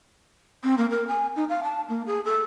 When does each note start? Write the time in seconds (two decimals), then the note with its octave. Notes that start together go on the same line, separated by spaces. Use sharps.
0.64 C4
0.77 A#3
0.90 A#4
1.08 G#5
1.36 D#4
1.49 F5
1.63 A5
1.89 A#3
2.06 G#4
2.25 A4